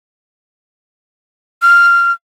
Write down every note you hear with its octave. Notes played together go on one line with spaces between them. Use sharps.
F6